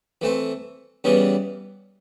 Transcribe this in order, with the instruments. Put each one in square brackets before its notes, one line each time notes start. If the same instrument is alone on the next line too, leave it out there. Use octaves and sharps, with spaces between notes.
[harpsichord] E3 A3 C4
C#3 E3 G3 B3